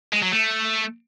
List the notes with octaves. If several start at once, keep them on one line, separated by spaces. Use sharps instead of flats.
G#3
F#3
A3